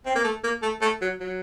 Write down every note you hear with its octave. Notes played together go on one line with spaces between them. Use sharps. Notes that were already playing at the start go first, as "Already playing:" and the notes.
C4
A#3
A3
A#3
A3
A3
F#3
F#3